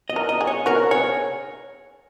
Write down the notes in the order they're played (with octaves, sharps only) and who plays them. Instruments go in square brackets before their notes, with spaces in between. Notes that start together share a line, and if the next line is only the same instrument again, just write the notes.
[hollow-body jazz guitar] D#5
[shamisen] A#4
[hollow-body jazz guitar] D#5
[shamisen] G#4
[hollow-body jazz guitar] C#5
[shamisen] F#4 [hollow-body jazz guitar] A#4
[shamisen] G#4 [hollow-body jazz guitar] C#5